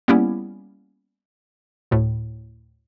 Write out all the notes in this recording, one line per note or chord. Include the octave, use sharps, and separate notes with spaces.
G3 A#3 B3 C#4 E4 G4
D2 A2